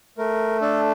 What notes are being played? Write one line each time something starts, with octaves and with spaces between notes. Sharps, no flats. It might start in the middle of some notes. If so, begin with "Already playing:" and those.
A3 A#4
D4 A4